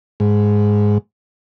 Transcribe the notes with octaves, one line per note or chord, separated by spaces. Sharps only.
G#2